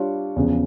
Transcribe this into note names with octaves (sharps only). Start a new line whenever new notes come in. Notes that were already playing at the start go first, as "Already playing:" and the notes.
Already playing: G3 D4 F4 C#5
E2 C#3 F3